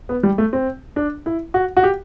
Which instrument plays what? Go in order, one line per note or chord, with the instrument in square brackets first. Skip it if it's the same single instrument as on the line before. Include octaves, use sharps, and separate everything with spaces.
[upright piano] B3
G3
A3
C4
D4
E4
F#4
F#4
G4